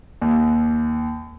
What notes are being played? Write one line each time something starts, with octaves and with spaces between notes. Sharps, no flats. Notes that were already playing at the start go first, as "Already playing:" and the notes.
D#2